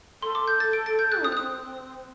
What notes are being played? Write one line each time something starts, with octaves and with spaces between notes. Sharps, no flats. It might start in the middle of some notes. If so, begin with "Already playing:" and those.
A4 C6
D6
G6
A6
D7
A6
G6
F#6
C4 D#6
F#6
D#6